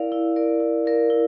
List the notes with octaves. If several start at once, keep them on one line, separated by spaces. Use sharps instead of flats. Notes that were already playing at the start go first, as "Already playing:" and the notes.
Already playing: E4 A#4 D5 F5
E4
A#4 D5 F5
E4
A#4 D5 F5
E4